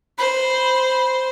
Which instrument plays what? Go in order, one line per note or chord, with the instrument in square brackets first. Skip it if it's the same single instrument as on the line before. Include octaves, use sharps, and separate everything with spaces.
[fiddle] C5 [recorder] B5